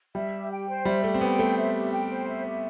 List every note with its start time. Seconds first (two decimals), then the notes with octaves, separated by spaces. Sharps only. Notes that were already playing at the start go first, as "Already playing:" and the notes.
0.15 G3 E5
0.33 G4
0.50 G5
0.68 C5
0.85 G3 E5
1.04 A3 G4
1.14 C4
1.21 B3 G5
1.38 A3 C5
1.57 E5
1.75 G4
1.93 G5
2.10 C5
2.28 E5
2.46 G4